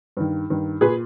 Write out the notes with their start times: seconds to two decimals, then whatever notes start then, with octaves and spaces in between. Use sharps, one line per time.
0.17 G2 D#3
0.50 G2 D#3
0.81 A#2 G#4 B4